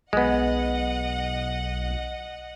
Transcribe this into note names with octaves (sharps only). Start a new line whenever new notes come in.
B1 G#3 B3 D#5 F#5